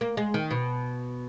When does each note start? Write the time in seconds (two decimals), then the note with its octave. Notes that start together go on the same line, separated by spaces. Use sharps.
0.01 A#3
0.17 G#3
0.34 D#3
0.51 B2